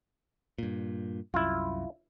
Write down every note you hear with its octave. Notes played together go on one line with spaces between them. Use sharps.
G2 A#2
C2 F#2 E4 F4